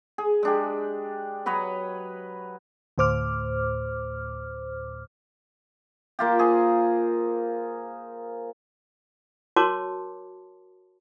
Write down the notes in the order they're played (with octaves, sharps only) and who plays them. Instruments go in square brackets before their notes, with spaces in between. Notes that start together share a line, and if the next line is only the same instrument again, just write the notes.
[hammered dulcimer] G#4
G#3 D4 G4
F#3 B4 C#5 D#5
[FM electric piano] D2 A2 C5 D6 F6
[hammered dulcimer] A#3 F4 G4
G#4 C5
[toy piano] F#4 A#4 C#5 A5 C6 D6